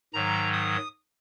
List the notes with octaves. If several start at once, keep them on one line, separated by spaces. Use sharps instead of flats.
G#2 D#3 F#3 A#5
D#6